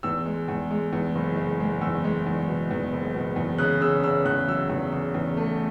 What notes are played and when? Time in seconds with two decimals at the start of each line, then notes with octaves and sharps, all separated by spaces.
0.03 E2 E6
0.26 G#3
0.48 E2
0.71 G#3
0.93 E2
1.15 F#1
1.37 G#3
1.60 G#3
1.81 E2 E6
2.04 G#3
2.26 E2
2.48 B2
2.71 E2
2.92 F#1
3.14 B2
3.36 E2
3.58 C#3 F#6
3.81 C#3 E6
4.04 C#3 E6
4.25 E2 F#6
4.47 F#3 E6
4.70 E2
4.93 C#3
5.14 E2
5.37 A3